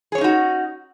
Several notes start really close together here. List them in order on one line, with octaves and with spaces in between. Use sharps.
G#4 C#5 C#4 D#4 F#4